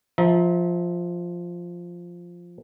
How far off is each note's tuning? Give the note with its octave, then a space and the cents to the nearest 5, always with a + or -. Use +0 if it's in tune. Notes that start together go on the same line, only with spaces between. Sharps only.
F3 +0 E5 -35 A#5 +0